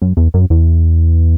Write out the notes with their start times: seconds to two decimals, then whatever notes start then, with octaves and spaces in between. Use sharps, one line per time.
0.02 F#2
0.17 E2
0.34 F#2
0.50 E2